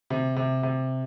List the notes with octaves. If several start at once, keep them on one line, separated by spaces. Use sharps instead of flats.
C3
C3
C3